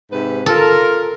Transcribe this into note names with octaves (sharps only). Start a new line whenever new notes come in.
G#2 C3 B4
F4 A4 A#4